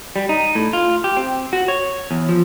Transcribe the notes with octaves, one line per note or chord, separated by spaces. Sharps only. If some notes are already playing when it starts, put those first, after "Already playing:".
G3
D#4
A2
F4
G4
C4
F#4
C#5
E2
F3